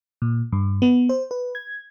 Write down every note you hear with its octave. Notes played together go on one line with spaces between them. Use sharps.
A#2
G2
B3
C5
B4
G#6